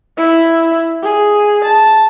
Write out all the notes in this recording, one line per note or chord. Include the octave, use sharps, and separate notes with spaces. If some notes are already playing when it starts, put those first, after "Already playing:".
E4
G#4
A5